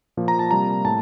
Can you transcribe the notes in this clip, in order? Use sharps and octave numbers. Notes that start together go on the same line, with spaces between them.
A#2 F3 A#3
A#5
A5
C3 G3 A#3 A#5
A2 A5